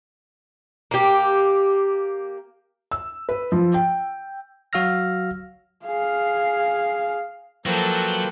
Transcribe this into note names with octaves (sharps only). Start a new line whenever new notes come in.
A#3 G4
E6
B4
F3
G5
F#3 F#4 F5 E6 F6 A#6
G#4 F5
F3 F#3 A#3 A4 B4 G5